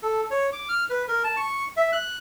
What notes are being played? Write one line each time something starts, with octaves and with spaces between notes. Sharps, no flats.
A4
C#5
D6
F6
B4
A#4
A5
C#6
E5
F#6